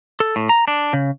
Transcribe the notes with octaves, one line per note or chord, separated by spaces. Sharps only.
A4
A2
A#5
D4
C#3